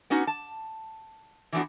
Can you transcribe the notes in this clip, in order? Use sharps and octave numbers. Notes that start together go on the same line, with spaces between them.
B3 C#4 D#4 F#4
A5
E3 F3 A3 B3 D4 F#4